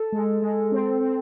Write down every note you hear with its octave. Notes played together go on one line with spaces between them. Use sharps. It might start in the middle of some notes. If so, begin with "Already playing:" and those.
Already playing: A4
G#3
G#3
C4
C4